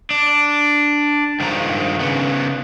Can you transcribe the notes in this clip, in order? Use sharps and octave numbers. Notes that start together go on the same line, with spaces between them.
D4
G2 D#3 F3 G#3 A#5
C#3 B3